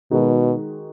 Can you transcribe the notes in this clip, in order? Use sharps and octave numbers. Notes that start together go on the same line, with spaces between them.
B2 D#3 G#3 D#4 F#4